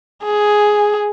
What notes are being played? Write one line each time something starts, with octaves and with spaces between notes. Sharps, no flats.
G#4